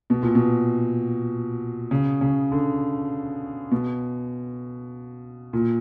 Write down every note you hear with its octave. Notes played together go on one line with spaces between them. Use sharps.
B2
A#2
B2
C#3
C#3
D3
B2
A#2